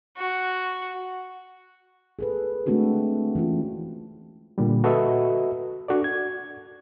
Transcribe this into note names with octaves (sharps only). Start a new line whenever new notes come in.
F#4
G#4 A4 B4
G#3 A3 C4 D4 F#4 A4
E3 G#3 C#4 F4
A#2 D3 G3
F#4 A4 B4 D#5 E5
D4 F#4 A4 D5
G#6